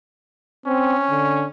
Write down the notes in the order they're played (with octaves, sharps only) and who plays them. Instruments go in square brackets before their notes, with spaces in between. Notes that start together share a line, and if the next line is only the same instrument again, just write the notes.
[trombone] C4 [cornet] C#4
[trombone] D3